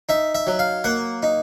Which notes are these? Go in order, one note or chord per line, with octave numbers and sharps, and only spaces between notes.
D#4 E5
E5
F#3
F5
A#3 F#5
D#4